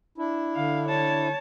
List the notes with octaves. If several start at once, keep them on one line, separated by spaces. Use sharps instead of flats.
D4 E4
D3 F5
C#5 A5